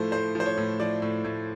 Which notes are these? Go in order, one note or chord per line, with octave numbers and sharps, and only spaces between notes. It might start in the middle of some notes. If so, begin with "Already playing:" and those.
Already playing: A2 F3 A3 C5
A2 C5
F3
C5
C#5
A2
F3 D5
A2
A2